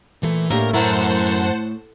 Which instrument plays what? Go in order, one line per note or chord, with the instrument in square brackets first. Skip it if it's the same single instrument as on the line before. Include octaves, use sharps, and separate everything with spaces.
[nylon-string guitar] A#2 A3 [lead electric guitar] E3
[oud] A2 [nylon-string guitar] A#3 D4 G4 [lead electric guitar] A#4 A#5
[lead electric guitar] F#2 A#5 [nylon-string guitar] E4 A#4 [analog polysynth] C5 F#5 A5